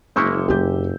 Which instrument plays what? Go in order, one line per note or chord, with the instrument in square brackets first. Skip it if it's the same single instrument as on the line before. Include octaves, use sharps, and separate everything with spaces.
[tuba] F#1 [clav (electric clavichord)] G#3 A#3 E4 [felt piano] C#6 E6 G6
[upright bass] F#2 D4 [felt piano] G4 G6